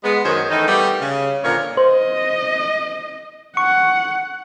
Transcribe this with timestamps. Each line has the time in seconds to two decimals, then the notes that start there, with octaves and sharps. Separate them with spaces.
0.03 G#3 B3
0.24 F#2 D#3 B3 C5 C#5
0.50 D#3 E3 A3 D#4
0.67 G3 A3 B3 G4
1.01 C#3
1.43 A#2 D3 F3 A#4 C#5
1.77 C5 D#5
3.57 F#5 C#6